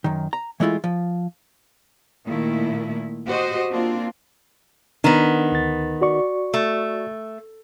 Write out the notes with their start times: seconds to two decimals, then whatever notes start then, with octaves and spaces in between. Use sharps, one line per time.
0.04 F#2 D#3
0.33 A#5
0.60 E3 G#3 A3 E4 F4
0.84 F3
2.25 A#2 D#3 A3 E4
3.26 F#4 G4 C5 D#5
3.70 A#3 C4 D4 F4
5.04 D#3 B3 D4
5.52 D2 A6
6.01 F#4 D5 C#6
6.54 A3